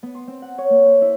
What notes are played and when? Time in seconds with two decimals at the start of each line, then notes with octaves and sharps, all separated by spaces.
0.03 B3
0.15 C6
0.28 C4
0.42 F#5
0.58 C#5
0.70 A#3
0.86 C5
1.01 E4